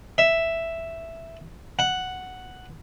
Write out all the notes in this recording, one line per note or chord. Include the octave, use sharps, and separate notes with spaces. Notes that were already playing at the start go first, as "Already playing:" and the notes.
E5
F#5